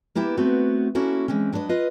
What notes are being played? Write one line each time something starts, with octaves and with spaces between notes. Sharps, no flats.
A#3 B3 E4 G4 E5
A3 B3 C4 F#4
A#3 C#4 E4 F#4 A4
E3 G#3 C4 C#4
F#3 D4 B4 C#5 D#5
F4 B4 D#5